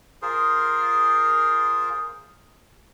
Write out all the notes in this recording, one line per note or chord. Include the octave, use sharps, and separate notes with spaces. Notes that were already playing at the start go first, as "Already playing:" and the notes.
F4 G#4 A#4 C5